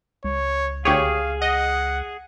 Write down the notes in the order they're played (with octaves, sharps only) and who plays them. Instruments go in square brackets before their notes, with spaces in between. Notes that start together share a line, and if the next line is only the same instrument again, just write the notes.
[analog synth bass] C#2 [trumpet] C#5
[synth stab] D2 G4 C#5 [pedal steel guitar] G#4 [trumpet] F5
[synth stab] D#5 [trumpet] F#5